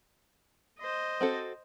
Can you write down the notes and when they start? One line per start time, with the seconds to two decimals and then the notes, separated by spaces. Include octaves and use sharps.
0.79 C5 D#5
1.21 C4 F#4 A4